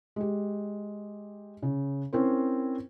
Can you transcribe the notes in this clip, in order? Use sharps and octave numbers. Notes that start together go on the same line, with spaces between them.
G#3 G4
C#3
C4 C#4 E4 A#4 C5